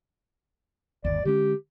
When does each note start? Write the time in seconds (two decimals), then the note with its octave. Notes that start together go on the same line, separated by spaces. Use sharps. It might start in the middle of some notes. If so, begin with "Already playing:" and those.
1.05 G1 D#2 D5
1.25 D3 G#3 C#4 G4